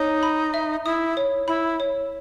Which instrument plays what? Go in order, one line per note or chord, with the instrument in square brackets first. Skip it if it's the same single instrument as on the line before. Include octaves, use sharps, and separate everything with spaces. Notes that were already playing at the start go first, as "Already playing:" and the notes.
Already playing: [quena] D#4 [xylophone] C#5
[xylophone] B5
E5
[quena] E4 [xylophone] D#6
[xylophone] C#5
[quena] E4 [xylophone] B5
[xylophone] C#5